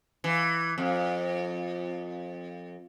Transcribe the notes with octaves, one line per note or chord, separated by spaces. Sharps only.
E3
F2